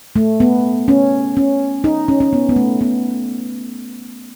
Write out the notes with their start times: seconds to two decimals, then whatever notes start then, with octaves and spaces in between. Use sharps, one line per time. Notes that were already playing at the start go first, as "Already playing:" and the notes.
0.16 A3
0.40 B3
0.88 C#4
1.37 C#4
1.84 D#4
2.08 C#4
2.20 C#4
2.33 B3
2.49 B3
2.56 A3
2.81 B3